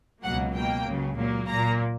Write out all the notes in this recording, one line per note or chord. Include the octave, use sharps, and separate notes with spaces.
C#2 B2 F#3 A#3 F#5
B2 A#3 G5
C#2 C#3 F#3
A#2 F#3 A#3
A#2 A#3 A#5